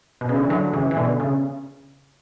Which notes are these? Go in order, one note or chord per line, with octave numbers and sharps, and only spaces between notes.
B2
C#3
D3
E3
D3 F#3
C#3 E3
E3
B2 D3
C#3